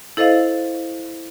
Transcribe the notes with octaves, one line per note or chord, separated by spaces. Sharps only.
E4 A4 C5 D#5 F5